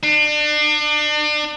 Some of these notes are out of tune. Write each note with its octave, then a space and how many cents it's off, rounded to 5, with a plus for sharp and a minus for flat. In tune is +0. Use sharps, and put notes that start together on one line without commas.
D4 +35